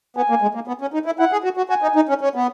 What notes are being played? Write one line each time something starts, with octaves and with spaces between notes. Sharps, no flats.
B3 G#5
A#3
G#3
A#3
B3
C#4
D#4
E4
E4 F#5
G#4
F#4
F#4
F#4 G#5
D#4
D#4
C#4
C#4
B3